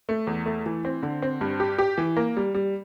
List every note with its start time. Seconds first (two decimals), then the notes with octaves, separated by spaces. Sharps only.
0.09 A3
0.27 E2
0.46 A3
0.66 E3
0.85 C4
1.03 D3
1.22 C4
1.41 G2
1.60 G4
1.79 G4
1.98 E3
2.17 A#3
2.37 G3
2.54 G3